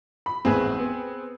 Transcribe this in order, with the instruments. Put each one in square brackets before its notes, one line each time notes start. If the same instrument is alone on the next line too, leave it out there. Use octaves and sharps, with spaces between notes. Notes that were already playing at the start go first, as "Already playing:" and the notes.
[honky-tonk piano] B5
[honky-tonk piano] G#1 E2 A2 [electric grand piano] C4 G#4 B4
[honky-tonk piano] B3